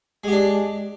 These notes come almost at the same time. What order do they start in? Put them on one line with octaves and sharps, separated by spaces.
G#3 G4 D4